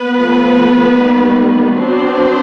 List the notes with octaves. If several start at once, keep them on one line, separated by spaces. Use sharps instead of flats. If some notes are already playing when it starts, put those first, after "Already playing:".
Already playing: B3 B4
F3 A3 C4
D#3 G3 A#3
F#3 B3 C4 D4 C5